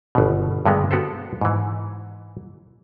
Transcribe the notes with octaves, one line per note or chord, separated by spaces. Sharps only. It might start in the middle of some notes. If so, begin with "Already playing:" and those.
G1 B2
G2 D3 G#3 B3
B3 F#4 G4 A4 C5
G#2 E3